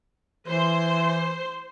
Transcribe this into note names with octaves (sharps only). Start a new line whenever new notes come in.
E3 C5